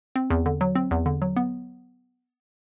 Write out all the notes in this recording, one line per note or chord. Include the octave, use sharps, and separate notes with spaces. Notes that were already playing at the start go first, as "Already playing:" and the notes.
C4
E2
D3
F#3
C4
E2
D3
F#3
B3